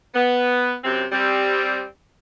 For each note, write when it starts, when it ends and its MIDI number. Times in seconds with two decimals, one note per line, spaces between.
0.15 0.74 59
0.84 1.05 42
0.84 1.05 48
0.84 1.05 60
1.12 1.83 55
1.12 1.83 60